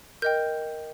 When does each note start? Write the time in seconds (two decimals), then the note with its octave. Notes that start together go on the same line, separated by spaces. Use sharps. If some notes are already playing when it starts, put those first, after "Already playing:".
0.22 A#4 D#5 G5 G6